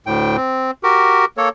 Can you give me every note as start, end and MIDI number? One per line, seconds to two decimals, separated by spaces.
0.06 0.37 38
0.06 0.37 45
0.06 0.37 79
0.37 0.71 60
0.83 1.25 66
0.83 1.25 67
0.83 1.25 70
1.37 1.49 58
1.37 1.49 69
1.37 1.49 73